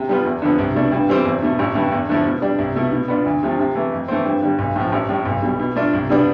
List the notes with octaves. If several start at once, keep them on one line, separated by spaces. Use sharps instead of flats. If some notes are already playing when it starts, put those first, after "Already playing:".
Already playing: C3
G3 B3 F4
E2
D3 F3 B3
C2
B2 A3 D4
G2
E3 G3 C4
E2
B2 A3
A1
G2 D3 A3
E2
D3 F3 A3 E4
B2
G3 D4
C2
B2 A3 E4
B2
B3 D4 F4
D2
C3 F3 A3
C3
E3 A3
F2
E3 A3 C4
G2
D3 G3
B1
A2 F3
A1
A2 G3
B1
B2 G3
B2
A3 D4 F4
C2
B2 G3 B3 D4